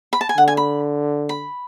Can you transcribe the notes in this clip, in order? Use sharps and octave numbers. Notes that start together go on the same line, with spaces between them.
B5
A5
G#5
D3 F#5
G#5
B5
B5